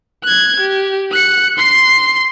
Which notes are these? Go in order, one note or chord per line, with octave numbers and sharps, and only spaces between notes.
F#6 G#6
G4
F#6 C#7
C6 C7